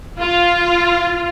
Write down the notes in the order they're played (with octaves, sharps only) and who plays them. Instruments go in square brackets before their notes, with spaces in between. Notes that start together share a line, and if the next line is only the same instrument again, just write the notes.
[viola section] F4